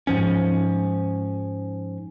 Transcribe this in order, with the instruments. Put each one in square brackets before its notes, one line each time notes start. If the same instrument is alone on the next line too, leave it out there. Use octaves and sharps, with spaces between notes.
[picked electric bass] G#2 F3 C#4